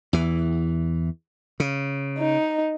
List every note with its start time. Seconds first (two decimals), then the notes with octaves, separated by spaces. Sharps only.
0.13 E2 E3
1.60 C#3
2.19 D#4